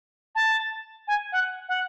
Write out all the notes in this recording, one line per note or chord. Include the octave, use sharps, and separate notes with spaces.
A5
G#5
F#5
F#5